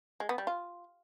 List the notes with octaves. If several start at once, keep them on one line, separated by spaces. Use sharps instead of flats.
G#3
B3
G3
F4